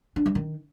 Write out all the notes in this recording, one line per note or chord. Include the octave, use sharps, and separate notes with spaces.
D4
G3
D#3